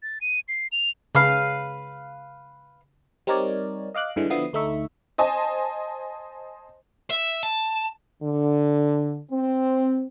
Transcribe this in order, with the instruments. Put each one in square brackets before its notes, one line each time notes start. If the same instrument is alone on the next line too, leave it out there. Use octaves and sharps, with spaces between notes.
[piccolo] A6
D#7
C7
F7
[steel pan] C#3 [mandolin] B4 F5
[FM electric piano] G3 C4 D#4 A#4 C#5 D5
D#5 F5 D6 F#6
G2 D3 E3 G#3
D3 F3 B3 E4 D#6 C7
D2 A3 D#4 E5 C#6
[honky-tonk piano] C5 D#5 G#5 A5
[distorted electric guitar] E5
A5
[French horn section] D3
C4